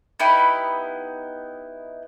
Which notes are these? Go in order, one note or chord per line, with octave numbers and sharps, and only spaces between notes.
B3 D#4 E4 G4